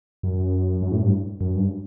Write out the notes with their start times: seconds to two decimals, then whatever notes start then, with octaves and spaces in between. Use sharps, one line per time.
0.23 F#2
0.82 F#2
0.92 A2
1.02 G2
1.41 F#2
1.55 G2